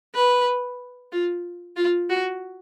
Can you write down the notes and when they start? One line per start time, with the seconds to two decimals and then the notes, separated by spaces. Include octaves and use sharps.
0.15 B4
1.12 F4
1.77 F4
2.10 F#4